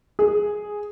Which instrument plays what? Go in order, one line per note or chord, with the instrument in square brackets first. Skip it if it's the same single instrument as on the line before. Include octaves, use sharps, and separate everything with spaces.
[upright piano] G#4